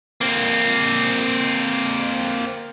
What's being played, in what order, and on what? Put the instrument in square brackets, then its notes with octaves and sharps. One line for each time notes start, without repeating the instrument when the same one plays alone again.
[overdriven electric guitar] A#3 C4